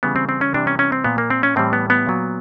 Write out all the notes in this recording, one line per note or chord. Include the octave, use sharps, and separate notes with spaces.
C#3 E3 G3 B3
C4
C4
C#4
C3 E3 G3 D4
C#4
C#4
C4
A#2 F3 B3
A#3
C4
C#4
A2 E3 G3 C4
B3
B3
A#2 F#3